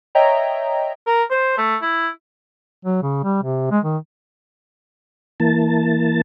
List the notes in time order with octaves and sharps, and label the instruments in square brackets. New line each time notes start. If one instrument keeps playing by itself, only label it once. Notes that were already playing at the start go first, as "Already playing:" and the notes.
[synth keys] C#5 D#5 E5 G5 A#5
[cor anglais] A#4
C5
A3
E4
[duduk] F#3
C#3
G3
C3
G#3
D#3
[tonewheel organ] E3 A#3 A5